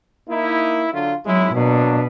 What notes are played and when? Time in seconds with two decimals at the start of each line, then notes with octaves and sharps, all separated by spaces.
0.29 A#3 D#4 E4
0.92 D3 F#3 F4
1.26 G#1 F#3 G#3 E4
1.54 B2 F#3 A#3 D4